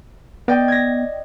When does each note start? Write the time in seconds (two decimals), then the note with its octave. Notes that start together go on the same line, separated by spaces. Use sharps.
0.48 B3 D5 D#5 G5
0.68 G#6 A#6